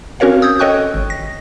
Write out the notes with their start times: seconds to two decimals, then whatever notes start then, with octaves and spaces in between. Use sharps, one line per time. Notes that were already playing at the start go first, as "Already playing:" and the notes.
0.20 C4 C#4 F#4 A#4 C#5 F5
0.42 D#6 E6 G6 G#6
0.59 A4 C#5 D#5 G5 C#6 F#6
0.94 G#1
1.10 A#6